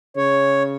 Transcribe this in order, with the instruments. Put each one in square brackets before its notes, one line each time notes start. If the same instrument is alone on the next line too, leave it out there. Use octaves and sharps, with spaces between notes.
[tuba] C#3 [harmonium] C#5